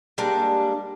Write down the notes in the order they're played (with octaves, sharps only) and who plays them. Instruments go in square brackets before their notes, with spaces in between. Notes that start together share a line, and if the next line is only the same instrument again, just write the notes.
[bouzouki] G3 G#3 A#3 D4